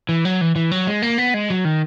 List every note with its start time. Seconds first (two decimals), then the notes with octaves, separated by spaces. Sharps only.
0.09 E3
0.25 F#3
0.41 E3
0.56 E3
0.72 F#3
0.87 G#3
1.02 A#3
1.18 B3
1.34 G#3
1.50 F#3
1.65 D#3